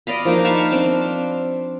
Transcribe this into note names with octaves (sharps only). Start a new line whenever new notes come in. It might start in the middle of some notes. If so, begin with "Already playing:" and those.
D5 D#5 F5 B5
F3 A#3 D4 D#4
F5 A5 B5 C#6
C4 D4